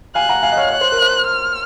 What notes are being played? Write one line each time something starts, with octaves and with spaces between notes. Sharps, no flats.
F5 G#5 F#6
F#5 A#5
F5 G#5
D#5
C#5 F5
C#5 F#6
C5
A#4
C5
F6